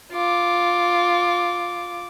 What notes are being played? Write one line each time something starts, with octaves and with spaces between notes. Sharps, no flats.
F4 D6